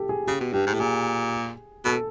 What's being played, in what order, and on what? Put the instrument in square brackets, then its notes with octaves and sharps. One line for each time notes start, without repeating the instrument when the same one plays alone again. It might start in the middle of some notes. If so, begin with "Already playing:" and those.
Already playing: [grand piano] G4 A4
G#4
[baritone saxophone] C#3 [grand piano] G4
[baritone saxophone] B2
[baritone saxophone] G2 [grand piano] G4
[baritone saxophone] G#2
A2
[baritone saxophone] A#2 [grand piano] G#4
[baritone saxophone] B2 [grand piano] A4